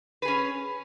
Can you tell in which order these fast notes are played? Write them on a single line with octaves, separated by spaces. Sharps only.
B4 G#4 C#4